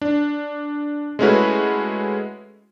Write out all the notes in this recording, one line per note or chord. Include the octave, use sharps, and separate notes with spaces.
D4
G#3 A3 C#4 E4 F#4 B4